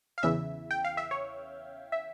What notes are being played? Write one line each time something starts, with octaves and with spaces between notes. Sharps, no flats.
F5
E2 C#3 E3 E5
G5
F5
E5
C#5
E5